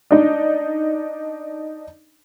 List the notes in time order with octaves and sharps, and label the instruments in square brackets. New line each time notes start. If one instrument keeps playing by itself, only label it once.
[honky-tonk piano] D4 D#4